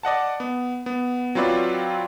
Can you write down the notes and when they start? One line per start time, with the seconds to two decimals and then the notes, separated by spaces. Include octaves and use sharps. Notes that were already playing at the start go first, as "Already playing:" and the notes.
0.03 D5 D#5 F#5 A5
0.40 B3
0.86 B3
1.35 F#3 C4 F4 B4 D5